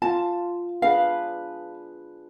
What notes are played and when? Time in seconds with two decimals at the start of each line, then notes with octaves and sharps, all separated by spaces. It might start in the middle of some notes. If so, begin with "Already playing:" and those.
0.02 F4 A5
0.82 D4 G#4 B4 F5